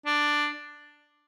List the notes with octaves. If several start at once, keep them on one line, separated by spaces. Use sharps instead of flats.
D4